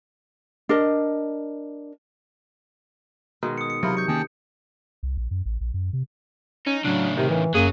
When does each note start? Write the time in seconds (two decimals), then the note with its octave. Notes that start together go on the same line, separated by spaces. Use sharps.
0.69 D4 A#4 D#5
3.43 B2 D#3 G#3
3.58 D#6 C#7
3.70 C#7
3.83 C3 F#3 E4 F4 A#4
3.97 C#6 G6 C#7
4.08 D#3 A#3 C#4 G#4 G5 A5
5.03 C2
5.17 A#1
5.31 F#2
5.46 A1
5.61 A#1
5.74 F#2
5.93 C3
6.66 C#4 D#4
6.85 A2 C#3 F#3 D4
7.17 C3 D#3
7.30 E3
7.55 F#2 F#3 A#3 G#4